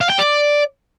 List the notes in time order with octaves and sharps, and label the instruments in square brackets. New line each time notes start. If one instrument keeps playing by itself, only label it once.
[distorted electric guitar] F5
G5
D5